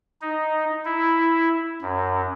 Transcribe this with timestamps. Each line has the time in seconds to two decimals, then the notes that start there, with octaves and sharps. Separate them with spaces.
0.22 D#4
0.85 E4
1.82 F#2